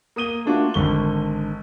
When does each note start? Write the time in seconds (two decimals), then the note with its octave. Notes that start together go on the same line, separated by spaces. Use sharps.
0.16 A#3 D#6 D#7 G7
0.45 A3 A#3 D4 F4 F#4
0.74 G#1 D3 C#6 G7